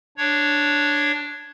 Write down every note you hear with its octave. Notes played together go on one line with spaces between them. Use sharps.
D4 C#5